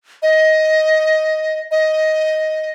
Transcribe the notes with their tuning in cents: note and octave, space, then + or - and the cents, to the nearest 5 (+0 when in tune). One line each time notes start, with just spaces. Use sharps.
D#5 +10
D#5 +10